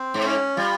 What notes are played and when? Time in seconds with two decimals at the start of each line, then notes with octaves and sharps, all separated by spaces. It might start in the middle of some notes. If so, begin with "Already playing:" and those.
Already playing: C4
0.14 G#2
0.25 C#4
0.57 G3 F4